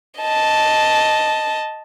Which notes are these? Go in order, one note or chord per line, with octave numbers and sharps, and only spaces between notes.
D#5 A5